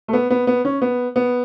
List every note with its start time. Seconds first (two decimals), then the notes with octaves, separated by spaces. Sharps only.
0.08 A3
0.13 B3
0.30 B3
0.47 B3
0.65 C#4
0.82 B3
1.16 B3